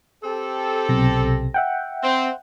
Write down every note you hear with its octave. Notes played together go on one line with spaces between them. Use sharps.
C4 G4 A4
B1 C3 A#6
E5 F#5 G5
C4